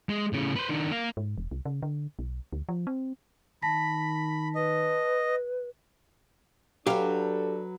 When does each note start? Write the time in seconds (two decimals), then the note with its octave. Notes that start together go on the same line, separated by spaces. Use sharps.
0.09 G#3
0.33 A2 C#3
0.56 B4 C5
0.69 D#3 D4
0.92 A#3 F5
1.17 G#2
1.38 E1
1.51 C2
1.65 C#3
1.82 D3
2.19 B1
2.53 D2
2.69 F3
2.87 C4
3.62 D#3 A5 B5 A#6 B6
4.55 B4 D#5
6.87 F#3 D4 G4 A4 B4 F5